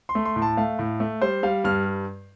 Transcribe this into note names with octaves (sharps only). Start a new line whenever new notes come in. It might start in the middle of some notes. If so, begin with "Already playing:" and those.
C6
A3
C6
A2
A5
A3 F5
A2
A3
G3 C5
G3 F5
G2 F6